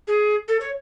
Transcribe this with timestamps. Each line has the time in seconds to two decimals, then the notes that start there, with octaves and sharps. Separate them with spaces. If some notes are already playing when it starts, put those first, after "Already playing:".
0.07 G#4
0.48 A4
0.61 C#5